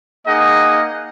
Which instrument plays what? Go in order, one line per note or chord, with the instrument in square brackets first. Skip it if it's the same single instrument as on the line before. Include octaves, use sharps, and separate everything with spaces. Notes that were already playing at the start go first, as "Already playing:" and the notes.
[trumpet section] A#3 D#4 G#4 D#5 F#5